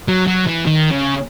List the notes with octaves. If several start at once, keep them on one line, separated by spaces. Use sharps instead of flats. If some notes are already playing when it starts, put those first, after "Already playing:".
F#3
F#3
E3
D#3
C#3